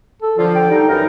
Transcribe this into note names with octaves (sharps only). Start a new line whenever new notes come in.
A4
D3 F3 F4 A4
G5
D3 G3 D#4
F#2 E3 D#4 A#4